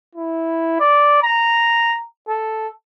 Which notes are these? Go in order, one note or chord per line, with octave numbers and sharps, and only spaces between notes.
E4
D5
A#5
A4